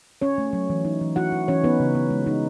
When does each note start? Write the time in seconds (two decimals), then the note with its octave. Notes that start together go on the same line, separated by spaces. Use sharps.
0.22 C#4 C#5
0.38 A3
0.53 F#3
0.70 E3
0.85 D#4
1.01 E3
1.16 E4 F#4 F#5
1.32 E4
1.48 E3 C#4 C#5
1.63 B3 D#4 B4
1.80 C#3
1.95 B3
2.11 G#3
2.27 D#4